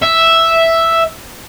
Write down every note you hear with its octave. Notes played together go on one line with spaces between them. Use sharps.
E5